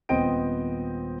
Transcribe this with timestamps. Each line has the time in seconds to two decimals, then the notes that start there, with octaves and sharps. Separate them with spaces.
0.09 D#1 B3 C4 D#5 G5 D7